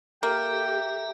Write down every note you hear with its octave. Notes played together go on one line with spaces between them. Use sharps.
A#3 G4 A4 E5 G5 A#5